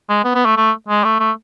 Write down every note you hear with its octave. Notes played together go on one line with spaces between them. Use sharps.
G#3
B3
B3
A3
A3
G#3
A3
A3